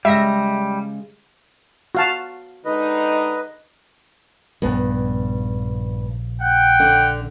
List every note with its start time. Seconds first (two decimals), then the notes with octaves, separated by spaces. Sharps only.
0.05 C#3 G3 G#3 E5 A#6
1.95 F#4 F5 A5
2.65 D3 G#3 D#4 B4 D#5
4.62 A#1 G2 C#3 B3
6.41 F#5 G5
6.80 D3